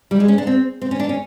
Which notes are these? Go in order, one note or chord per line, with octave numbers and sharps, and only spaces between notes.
G3
G#3
C#4
D4
C4
C4
C#4
D4
C#4